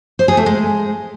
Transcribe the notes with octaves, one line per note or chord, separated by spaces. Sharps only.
C5
G#4
A3
G#3